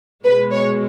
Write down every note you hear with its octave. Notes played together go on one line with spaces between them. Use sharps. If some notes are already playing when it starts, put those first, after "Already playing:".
B2 G#3 B4
C#5